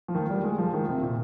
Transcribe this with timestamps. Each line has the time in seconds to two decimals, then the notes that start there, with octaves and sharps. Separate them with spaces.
0.08 F3
0.15 D#3
0.30 G3
0.44 G#3
0.58 F3
0.73 D#3
0.88 C3
1.02 A#2